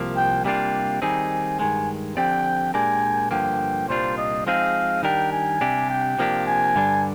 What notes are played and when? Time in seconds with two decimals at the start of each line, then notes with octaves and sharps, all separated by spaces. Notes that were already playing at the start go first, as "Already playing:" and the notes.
Already playing: C2 C3 F3 A#3
0.17 G5
0.44 C3 G3 A#3 D4 F4 G5
1.02 D#3 G3 C4 D#4 G#4 G#5
1.59 G2 D#3 G#3 G#5
2.17 D3 F3 C4 G4 D5 G5
2.74 A#2 G#3 D4 G4 A#4 G#5
3.31 G2 D3 F3 A#3 G5
3.88 C2 A#2 G3 D4 F4 C5
4.18 D#5
4.46 F3 G#3 C4 D#4 G#4 F5
5.03 D#3 G3 D4 G4 A#4 G5
5.32 G#5
5.61 C3 G3 D4 G4
5.90 G5
6.19 C3 F3 A#3 D4 G4
6.47 G#5
6.75 G2 D3 G3 D4